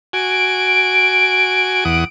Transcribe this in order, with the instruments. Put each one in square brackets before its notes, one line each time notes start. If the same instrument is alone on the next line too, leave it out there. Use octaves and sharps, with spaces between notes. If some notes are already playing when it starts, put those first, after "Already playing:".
[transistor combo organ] F#4 G#5 [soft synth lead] D7
[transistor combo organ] E2 F#5 D#6